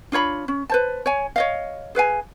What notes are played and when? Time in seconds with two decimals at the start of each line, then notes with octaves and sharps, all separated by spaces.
0.12 D4 F4 C#5 B5
0.48 C#4
0.70 B4 C5 A5
1.06 C#5 G#5
1.36 C#5 D#5 F5
1.95 G#4 B4 F5 G#5